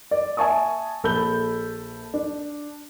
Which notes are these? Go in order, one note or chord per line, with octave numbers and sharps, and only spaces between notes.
D5
E5 G#5 A5 C#6 D#6
A#1 A4 B5 G6 G7
D4